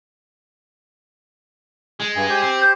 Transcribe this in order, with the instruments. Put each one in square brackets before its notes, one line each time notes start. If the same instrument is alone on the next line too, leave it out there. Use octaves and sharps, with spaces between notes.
[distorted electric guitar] G#3
[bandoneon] G2 [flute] G#5
[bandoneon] G4 C5
[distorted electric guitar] C4
[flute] G6